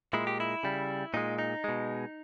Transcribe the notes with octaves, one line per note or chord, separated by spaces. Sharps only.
A#2 G#3 E4
G4
E4
C#3 G3
A#2 G#3 D#4
D#4
B2 G#3